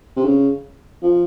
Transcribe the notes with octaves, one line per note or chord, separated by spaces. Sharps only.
C3
C#3
F3